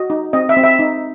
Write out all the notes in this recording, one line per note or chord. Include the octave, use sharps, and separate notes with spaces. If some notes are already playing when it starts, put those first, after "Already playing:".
Already playing: F#4 D#5
D#4
C4 D#5
E5
C4
E5
D#4